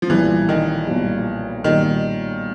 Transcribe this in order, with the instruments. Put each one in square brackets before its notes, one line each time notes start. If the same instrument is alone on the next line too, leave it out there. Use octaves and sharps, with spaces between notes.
[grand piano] F3
[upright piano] B1 A#2 G3 [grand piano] E3
[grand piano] D#3
[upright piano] B1 A#2 G3
[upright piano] B1 A#2 G3 [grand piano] D#3